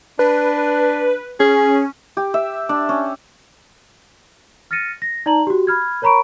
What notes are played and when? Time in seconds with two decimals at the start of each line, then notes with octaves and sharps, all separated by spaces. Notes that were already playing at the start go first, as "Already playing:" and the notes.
0.19 D4 B4
1.40 C#4 G#4
2.17 G4
2.34 E5
2.69 D4
2.89 C#4
4.71 F6 A6 A#6 C#7 D#7
5.02 A#6
5.26 D#4 D5 A5 A#5 F#7
5.47 F#4 G4
5.67 B5 F6 G#6
6.02 A#4 C#5 A#5 B5 C#6 D7